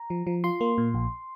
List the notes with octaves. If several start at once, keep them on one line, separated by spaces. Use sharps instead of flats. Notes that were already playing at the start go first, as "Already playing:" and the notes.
Already playing: A#5
F3
F3
F4 C6
A#3
A#2
A#1